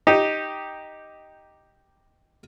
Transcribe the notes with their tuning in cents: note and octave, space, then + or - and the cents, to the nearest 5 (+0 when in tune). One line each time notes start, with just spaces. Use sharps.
D#4 +0 G4 +0